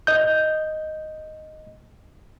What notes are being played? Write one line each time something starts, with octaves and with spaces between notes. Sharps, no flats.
D#5 G6